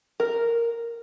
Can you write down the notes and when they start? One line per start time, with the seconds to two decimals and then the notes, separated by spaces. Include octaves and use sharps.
0.20 A#4